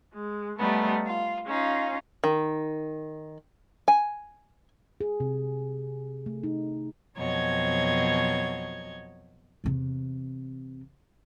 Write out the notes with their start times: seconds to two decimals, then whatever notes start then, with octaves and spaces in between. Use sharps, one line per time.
0.14 G#3
0.58 G3 A3 B3 D#4
1.07 F4
1.47 C#4 D#4 F4
2.24 D#3
3.88 G#5
5.01 G#4
5.20 C3
6.26 A3
6.43 D#4
7.17 F2 B2 F#3 C#5 D#5 G#6
9.64 E2 C3